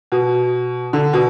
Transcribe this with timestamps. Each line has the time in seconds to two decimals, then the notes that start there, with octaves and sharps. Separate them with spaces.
0.12 B2
0.93 D3
1.13 B2